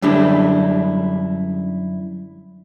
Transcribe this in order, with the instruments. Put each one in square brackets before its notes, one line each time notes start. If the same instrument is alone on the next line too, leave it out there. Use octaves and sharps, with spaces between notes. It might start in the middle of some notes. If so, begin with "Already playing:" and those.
[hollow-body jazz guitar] F#2 D3 G3 D4 E4